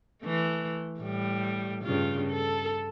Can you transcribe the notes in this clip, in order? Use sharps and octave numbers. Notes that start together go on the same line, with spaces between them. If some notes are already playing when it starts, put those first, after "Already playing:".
E3 A3
A2 G3
G2 C#3 F4
A4